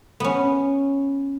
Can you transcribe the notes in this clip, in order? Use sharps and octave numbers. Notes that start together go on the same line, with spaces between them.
B3 C#4